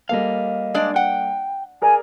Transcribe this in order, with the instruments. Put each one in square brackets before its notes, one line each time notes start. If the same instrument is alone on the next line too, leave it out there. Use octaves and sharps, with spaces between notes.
[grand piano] G3 A#3 A4 [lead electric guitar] D#5 F5
[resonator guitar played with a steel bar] G#3 D4 D5
[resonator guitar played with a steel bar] F#5 [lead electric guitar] G5
[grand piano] G#4 A#4 D5 [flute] G#5